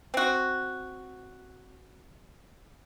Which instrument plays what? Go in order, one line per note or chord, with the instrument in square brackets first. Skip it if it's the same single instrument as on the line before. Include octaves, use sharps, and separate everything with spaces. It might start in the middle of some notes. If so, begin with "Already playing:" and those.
[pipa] C4 F#4